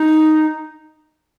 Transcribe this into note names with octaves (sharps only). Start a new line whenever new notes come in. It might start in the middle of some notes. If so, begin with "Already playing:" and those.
Already playing: D#4